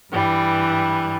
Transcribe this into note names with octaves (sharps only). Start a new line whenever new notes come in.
G2 E3 G3